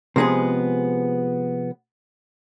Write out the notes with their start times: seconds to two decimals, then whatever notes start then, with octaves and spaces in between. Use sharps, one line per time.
0.16 C3 F3 G#3 B3 G#4